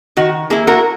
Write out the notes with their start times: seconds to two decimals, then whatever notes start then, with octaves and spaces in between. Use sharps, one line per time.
0.17 D#3 F#4
0.50 A#3 E4 G#4
0.67 F#4 A#4